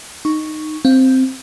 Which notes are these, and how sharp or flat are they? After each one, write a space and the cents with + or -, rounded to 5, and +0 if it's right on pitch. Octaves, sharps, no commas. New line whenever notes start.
D#4 -10 C#6 +0
C4 +0 F5 +0